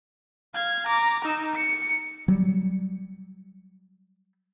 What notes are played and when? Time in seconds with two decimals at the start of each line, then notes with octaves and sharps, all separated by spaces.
0.55 F5 G#6
0.87 A#5 D6
1.25 D#4 E6
1.55 C#7
2.28 F#3 G3